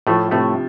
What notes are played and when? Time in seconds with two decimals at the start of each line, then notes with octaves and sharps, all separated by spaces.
0.07 A2 F3 A3
0.31 A2 C3 A3